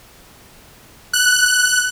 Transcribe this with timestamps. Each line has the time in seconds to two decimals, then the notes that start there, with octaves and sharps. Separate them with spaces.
1.13 F#6